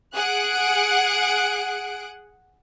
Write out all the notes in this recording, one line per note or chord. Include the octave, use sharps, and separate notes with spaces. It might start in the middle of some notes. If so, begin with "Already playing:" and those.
G#4 F#5 F#6 D7